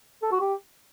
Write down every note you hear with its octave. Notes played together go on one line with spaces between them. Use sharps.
A4
F#4
G4